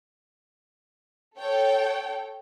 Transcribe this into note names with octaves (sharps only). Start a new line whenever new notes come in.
A4 C#5 G5